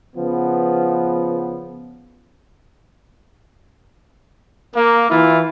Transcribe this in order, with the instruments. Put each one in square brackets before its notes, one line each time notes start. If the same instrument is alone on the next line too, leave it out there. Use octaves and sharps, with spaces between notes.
[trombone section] C#3 F3 B3
[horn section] A#3
E3 E4 F4